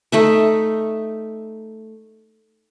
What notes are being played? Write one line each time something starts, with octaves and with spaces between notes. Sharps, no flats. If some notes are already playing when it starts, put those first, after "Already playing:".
A3 D#4 E5